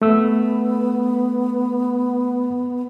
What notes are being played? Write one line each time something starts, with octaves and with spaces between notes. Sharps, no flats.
A3 B3 E6